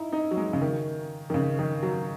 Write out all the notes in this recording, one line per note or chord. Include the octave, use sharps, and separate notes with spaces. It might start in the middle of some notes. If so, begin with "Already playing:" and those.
Already playing: D#4 E4
D#4
F#3
G#3
C#3
D#3
D#3
C#3
D#3
F#3